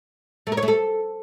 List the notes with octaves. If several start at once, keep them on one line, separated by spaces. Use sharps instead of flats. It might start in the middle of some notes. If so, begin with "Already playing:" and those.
A3
A#4
C#5
A3
A4